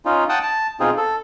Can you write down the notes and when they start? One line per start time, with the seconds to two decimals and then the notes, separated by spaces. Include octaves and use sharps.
0.05 C#4 D#4 F4
0.29 F#5 G5 A5 D#6
0.43 A5
0.80 B2 C4 D#4 F4 G#4
0.97 A4